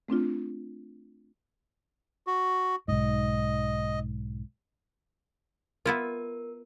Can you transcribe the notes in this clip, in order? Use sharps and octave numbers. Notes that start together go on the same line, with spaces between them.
A3 C4 D4 F4
F#4
B1 G#2 D#5
B3 E4 F4 A#4